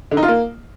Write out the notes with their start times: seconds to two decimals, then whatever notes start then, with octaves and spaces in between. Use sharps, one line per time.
0.11 D3
0.17 D#4
0.23 F4
0.28 A#3